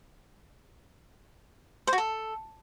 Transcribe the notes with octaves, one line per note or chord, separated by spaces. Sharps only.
C5
F#4
A4